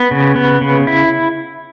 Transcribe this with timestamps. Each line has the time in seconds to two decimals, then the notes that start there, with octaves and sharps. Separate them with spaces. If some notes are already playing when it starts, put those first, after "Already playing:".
Already playing: B3
0.11 C#3
0.36 B3
0.61 C#3
0.87 E4